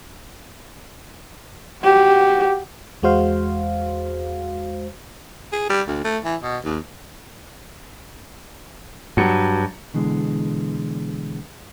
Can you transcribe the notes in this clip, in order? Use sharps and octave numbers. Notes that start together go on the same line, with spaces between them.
F#4 G4
E2 G#3 F#4 C5 F5
G#4
G3
D2
A3
E3
B2
D#2
G2 F#3 C#7
B2 D3 E3 G#3 B3